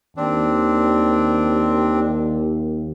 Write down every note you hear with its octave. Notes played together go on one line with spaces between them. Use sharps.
D#2 C4 D4